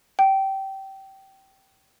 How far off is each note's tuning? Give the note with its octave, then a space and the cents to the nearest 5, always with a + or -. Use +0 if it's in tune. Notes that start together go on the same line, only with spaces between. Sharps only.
G5 -20